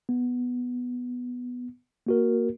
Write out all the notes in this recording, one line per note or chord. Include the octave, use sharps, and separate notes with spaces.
B3
A#3 F#4 A#4